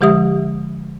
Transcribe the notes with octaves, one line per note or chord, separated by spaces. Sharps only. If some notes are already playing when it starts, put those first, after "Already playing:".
D3 F3 G#3 G4 E5 D#6